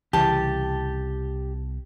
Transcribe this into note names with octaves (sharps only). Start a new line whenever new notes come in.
C2 C#3 E3 G4 A5